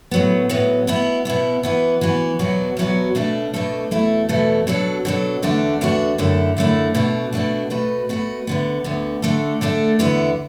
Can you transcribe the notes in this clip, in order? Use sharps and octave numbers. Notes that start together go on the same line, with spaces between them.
A2 F#3 B3
A2 F#3 B3
B2 B3 E4
B2 B3 E4
E3 B3 F#4
E3 B3 F#4
E2 B2 F#3 B3 F#4
E2 B2 F#3 B3 F#4
B2 A3 D4 A4
B2 A3 D4 A4
E2 B2 A3 E4 A4
E2 B2 A3 E4 A4
B2 F#3 D4 A4
B2 F#3 D4 A4
E2 D3 A3 D4 F#4
E2 D3 A3 D4 F#4
F#2 D3 A3 E4
F#2 D3 A3 E4
B2 A3 D4 F#4
B2 A3 D4 F#4
B2 A3 F#4 B4
B2 A3 F#4 B4
D2 D3 B3
D2 D3 B3
D3 A3 D4 A4
D3 A3 D4 A4
E2 D3 B3 E4